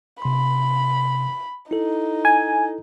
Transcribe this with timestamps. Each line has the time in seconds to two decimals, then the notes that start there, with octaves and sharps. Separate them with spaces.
0.22 C3 B5 C6
1.71 D#4 E4 A4
2.25 G#5